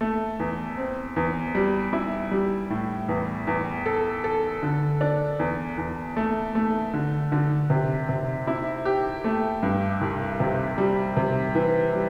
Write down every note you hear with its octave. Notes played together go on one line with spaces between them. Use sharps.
A3
E2
C4
E2
G3
E4
G3
A2
E2
E2
A4
A4
D3
D4
E2
E2
A3
A3
D3
D3
C3
C3
E4
G4
A3
G2
C2
C3
G3
C3
E3
G3